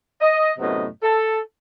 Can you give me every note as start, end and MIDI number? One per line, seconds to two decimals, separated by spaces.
0.21 0.52 75
0.59 0.87 42
0.59 0.87 45
0.59 0.87 48
0.59 0.87 59
0.59 0.87 75
1.03 1.38 69